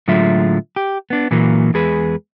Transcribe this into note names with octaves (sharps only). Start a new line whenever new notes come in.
A2 D3 F#3 G#3 F4 E5
G4
B3 D4
A#2 E3 F#3 A#3
E2 G#3 G#4 B4